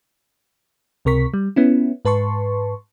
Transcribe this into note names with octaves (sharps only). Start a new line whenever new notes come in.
C#2 C3 A#4 C#6 B6
G3
B3 C#4 E4
G#2 B4 A5 C6 C#6